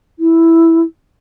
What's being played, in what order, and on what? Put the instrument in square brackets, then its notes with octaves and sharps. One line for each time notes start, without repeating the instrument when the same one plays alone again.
[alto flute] E4